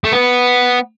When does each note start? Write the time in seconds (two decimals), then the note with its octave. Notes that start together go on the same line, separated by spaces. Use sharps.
0.04 A3
0.12 B3